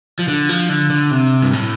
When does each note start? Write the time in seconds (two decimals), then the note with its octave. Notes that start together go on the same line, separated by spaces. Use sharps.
0.19 F3
0.28 D3
0.49 F3
0.69 D3
0.90 D3
1.11 C3
1.42 G2
1.53 A2